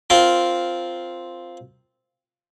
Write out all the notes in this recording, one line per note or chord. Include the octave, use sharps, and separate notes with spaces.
C4 F4 A#4